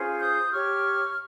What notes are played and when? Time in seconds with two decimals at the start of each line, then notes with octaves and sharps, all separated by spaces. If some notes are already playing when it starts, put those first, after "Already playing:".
Already playing: C#4 F4 G#4 C5
0.20 D#6 G6
0.52 G4 C#5 C#6 F6